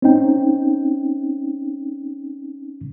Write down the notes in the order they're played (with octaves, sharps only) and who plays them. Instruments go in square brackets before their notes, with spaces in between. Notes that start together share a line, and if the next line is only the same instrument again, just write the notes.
[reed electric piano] C4 C#4 D#4 G5